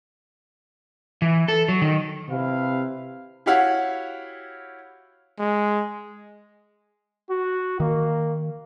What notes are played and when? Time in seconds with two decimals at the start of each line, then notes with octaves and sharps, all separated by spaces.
1.22 E3
1.48 A4
1.68 F#3
1.82 D#3
2.29 C3 E4 B4 F5
3.46 E4 F#4 G4 C#5 F5 F#5
5.39 G#3
7.30 F#4
7.80 D#3 A#3